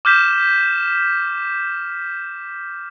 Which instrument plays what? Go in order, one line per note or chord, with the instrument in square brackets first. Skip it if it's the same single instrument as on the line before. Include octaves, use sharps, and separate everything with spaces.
[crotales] D6 F6 G6 B6 E7